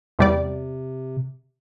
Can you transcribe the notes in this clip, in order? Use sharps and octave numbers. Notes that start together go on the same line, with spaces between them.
E2 C3 G3 D5